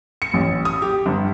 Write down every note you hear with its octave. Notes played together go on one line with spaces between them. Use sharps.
C#7
A1
D#6
G4
G1